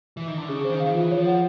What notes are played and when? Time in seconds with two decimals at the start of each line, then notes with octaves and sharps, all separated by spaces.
0.17 E3
0.28 D#3
0.38 D3
0.48 C#3 G#4
0.65 C5
0.70 D#3
0.80 F5
0.85 D#3
0.90 E3 F4
1.11 F3 C#5
1.26 F#5